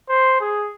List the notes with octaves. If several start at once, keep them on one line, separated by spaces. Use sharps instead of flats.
C5
G#4